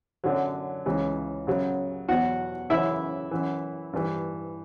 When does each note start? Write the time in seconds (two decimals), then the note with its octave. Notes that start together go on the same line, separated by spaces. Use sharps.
0.24 F#2 D3 F#3
0.86 C#2 C#3 E3
1.47 F#2 C#3 F#3
2.08 E2 B2 F#3 F#4 F#5
2.70 F#2 C#3 E3 E4 E5
3.31 F#2 E3
3.93 G2 E3